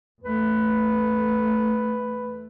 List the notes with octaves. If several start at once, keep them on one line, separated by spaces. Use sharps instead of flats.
E2 A3 B4